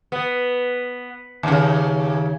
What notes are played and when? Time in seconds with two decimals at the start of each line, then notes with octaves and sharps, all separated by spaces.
0.12 B3
1.43 D#2 C#3